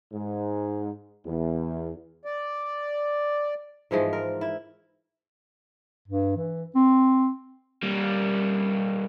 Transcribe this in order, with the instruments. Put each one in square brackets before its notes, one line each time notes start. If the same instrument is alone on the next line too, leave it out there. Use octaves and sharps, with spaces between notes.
[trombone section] G#2
E2
[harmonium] D5
[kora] G#2 E3 F3 G#3
A#4
E4
[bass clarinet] G2
E3
C4
[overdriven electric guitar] G3 A#3